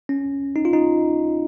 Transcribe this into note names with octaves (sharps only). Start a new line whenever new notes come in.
C#4
D#4
F4
D#4